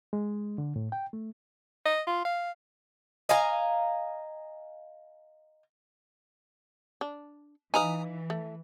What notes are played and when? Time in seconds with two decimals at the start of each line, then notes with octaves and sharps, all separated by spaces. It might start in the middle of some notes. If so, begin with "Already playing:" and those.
0.13 G#3
0.58 D3
0.76 A2
0.92 G5
1.13 A3
1.85 D#5
2.07 F4
2.25 F5
3.29 D#5 F5 G#5 A#5
7.01 D4
7.74 E3 D#4 B4 F5 G#5 A#5 D#6
8.30 A3